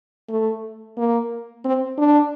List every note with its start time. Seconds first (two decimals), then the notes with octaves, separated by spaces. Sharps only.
0.29 A3
0.97 A#3
1.65 C4
1.98 D4